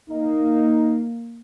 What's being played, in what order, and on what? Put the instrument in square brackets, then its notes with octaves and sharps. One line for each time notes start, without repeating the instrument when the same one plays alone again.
[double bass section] A#3 [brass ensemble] D#4